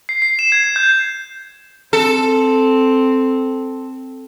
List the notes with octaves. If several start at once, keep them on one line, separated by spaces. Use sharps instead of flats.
C7
C7
E7
G#6
C7
G6
C4 A4